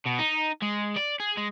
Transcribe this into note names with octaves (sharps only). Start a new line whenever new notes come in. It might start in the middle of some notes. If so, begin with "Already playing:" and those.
B2
D#4
G#3
D5
G#4
G#3